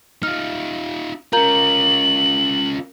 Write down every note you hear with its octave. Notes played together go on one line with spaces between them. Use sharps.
D#4 F4 F6
C#4 F4 A#4 A#5 G6 F#7